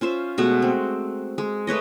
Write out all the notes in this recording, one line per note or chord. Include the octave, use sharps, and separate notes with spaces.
C#4 F4 C5 E5
B2 G#3 A3 F#4
C4
G#3
A3 B4 C#5 D#5